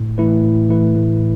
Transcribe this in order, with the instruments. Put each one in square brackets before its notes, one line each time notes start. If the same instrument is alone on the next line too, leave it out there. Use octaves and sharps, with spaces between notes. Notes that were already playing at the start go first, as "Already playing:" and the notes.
Already playing: [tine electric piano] A2
E3 A3 E4 B4
A2
E3 A3 E4 B4
A2